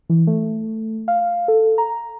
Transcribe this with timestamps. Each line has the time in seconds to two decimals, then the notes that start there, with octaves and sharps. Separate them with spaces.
0.10 E3
0.27 A3
1.08 F5
1.48 A4
1.78 A#5